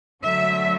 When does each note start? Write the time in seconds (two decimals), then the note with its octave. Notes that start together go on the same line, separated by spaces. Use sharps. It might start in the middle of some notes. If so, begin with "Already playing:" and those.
0.22 D3 F#3 A3 E5